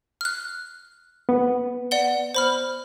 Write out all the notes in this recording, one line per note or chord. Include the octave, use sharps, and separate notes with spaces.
F6 F#6
B3
D5 F#5 G7
C5 B5 F6